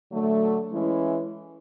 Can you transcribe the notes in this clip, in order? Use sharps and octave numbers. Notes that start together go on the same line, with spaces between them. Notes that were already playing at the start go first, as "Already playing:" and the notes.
D3 F#3 A3
E3 G#3 C#4 E4